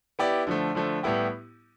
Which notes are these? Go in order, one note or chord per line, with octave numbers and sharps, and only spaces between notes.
B3 E4 G4 D5
D3 F3 A3
D3 F3 A3
A2 G3 B3 E4 G4